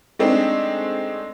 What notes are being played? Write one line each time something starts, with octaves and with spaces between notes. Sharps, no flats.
G#3 A3 C4 D4 D#4